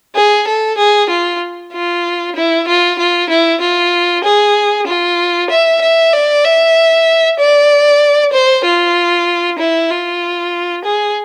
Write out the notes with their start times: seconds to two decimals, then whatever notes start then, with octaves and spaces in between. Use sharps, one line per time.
0.16 G#4
0.47 A4
0.78 G#4
1.10 F4
1.73 F4
2.36 E4
2.68 F4
2.99 F4
3.29 E4
3.61 F4
4.24 G#4
4.87 F4
5.50 E5
5.81 E5
6.13 D5
6.44 E5
7.39 D5
8.33 C5
8.64 F4
9.59 E4
9.90 F4
10.85 G#4